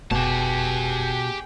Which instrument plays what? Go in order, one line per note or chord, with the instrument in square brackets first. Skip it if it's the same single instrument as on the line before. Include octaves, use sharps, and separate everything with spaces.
[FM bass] F1 [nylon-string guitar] B2 [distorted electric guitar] G4 A5 [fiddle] G#4 G5